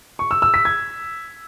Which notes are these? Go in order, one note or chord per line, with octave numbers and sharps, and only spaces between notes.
C#6
E6
E6
B6
G#6